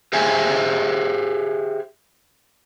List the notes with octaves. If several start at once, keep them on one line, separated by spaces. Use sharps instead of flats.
G4 G#4 C5 E5 F5 G#5